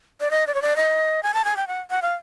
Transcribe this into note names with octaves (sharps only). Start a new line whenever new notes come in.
D5
D#5
D5
C#5
D5
D#5
G#5
A5
G#5
G5
F#5
F#5
F5